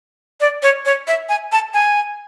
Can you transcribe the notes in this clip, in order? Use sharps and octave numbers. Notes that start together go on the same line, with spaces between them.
D5
C#5
C#5
E5
G#5
A5
G#5